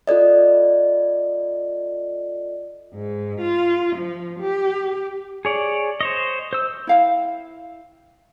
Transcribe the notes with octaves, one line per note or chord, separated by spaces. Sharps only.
F4 A4 D5 D#5
G#2
F4
F3
G4
G#4 C#5 D5
C5 C#5 D#5
C5 E6
E4 F5 G5